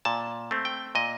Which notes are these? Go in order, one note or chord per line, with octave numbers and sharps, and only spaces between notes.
A#2 A5
A3 C4
G5
A#2 D#5